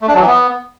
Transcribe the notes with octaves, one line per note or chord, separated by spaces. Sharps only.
A3
D4
F#3
E3
B3